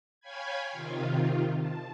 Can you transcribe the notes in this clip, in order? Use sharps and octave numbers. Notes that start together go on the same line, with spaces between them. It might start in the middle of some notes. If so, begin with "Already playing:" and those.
C#5 F5 G5 G#5 B5 G#6
C3 D#3 F4
A5